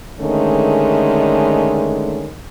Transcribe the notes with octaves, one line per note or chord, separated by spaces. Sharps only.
D3 D#3 G#3 A3 C#4